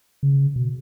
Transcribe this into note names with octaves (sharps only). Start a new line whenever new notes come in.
C#3
B2